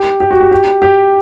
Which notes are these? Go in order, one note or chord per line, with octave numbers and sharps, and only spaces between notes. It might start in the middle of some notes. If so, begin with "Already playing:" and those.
Already playing: G4
G4
F#4
G4
G4
G4